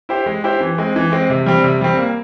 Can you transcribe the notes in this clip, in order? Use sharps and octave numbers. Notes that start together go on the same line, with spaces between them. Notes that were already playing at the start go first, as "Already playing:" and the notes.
E4 G4 C5
G#3
E4 G4 C5
E3
G#3 C4
E3
G#3 C4
C3
G3 C4
C3
G3 C4
A#3